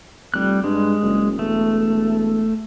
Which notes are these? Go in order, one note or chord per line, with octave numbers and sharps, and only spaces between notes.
F1 G3 F#6
G2 G#3
F#1
E1 A3